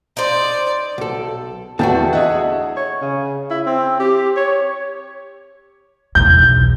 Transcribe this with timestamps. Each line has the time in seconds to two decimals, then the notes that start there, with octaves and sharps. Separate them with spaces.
0.17 D#4 C5 D5
0.98 B1 A4
1.79 E2 A3 D4 F#4 G5 A5
2.13 G#4 D#5 E5 F#5
2.77 C#5
3.02 C#3
3.50 E4
3.66 C4
4.00 G4
4.37 C#5
6.15 B1 E2 G6